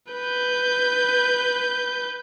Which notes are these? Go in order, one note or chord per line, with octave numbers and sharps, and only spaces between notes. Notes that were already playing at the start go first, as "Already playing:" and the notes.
B4 G6